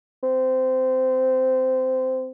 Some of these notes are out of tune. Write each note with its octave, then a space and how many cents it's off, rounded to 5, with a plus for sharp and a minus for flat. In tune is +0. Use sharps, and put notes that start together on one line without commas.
C4 -15